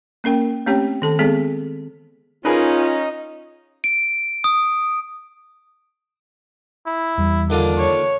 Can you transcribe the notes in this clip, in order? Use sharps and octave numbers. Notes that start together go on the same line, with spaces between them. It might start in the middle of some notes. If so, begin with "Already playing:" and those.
A#3 C#4 A#4 G5
A3 C4 C#4 G4 C#5 G5
D#3 A4 A5
G#3 B3 C4 G#4 A4
C#4 D#4 F4 G#4 A#4 B4
D7
D#6
E4
E2 G3
D#2 D3 D4 F4
C#5